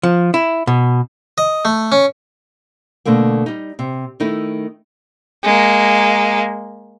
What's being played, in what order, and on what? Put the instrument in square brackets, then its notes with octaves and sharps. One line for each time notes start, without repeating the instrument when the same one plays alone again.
[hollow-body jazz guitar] F3
E4
B2
[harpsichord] D#5
A3
C#4
[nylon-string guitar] B2 D3 A3 A#3
G3 D#4
C3
D#3 A3 D#4 E4
[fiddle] G#3 A#3